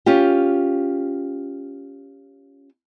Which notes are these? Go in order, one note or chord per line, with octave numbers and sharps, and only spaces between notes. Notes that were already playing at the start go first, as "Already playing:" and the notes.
C#4 F4 G4